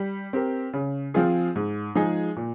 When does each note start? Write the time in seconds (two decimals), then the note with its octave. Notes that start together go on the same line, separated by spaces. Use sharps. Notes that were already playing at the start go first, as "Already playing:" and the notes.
Already playing: G3
0.33 C4 G4 A#4
0.73 C#3
1.14 F3 C4 F4 G#4
1.55 G#2
1.95 F3 G#3 D#4 G#4
2.36 A#2